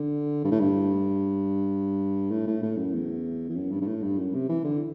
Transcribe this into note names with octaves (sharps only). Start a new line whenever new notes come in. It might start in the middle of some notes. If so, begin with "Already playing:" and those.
Already playing: D3
G2
A2
G2
A2
A2
A2
F#2
E2
E2
F#2
G2
G2
A2
G2
F#2
C3
E3
D3